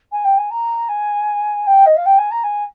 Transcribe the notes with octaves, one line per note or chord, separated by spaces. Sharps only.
G#5
G5
G#5
A#5
G#5
G5
D#5
F5
G5
G#5
A#5
G#5